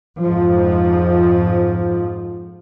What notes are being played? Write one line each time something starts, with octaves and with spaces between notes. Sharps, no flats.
F2 G#2 F3